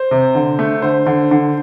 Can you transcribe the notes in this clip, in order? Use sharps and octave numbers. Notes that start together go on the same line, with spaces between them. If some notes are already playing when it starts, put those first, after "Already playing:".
Already playing: C5
C3
D3
A3
D3 C5
D3
D3